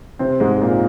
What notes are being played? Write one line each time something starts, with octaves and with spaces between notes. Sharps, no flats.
C3 C4
G#2 G#3
A#2 A#3